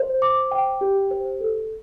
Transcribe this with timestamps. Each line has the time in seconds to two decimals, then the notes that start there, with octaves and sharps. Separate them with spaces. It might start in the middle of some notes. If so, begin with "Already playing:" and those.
Already playing: C5
0.22 D6
0.51 G5
0.81 G4
1.11 C5
1.40 A4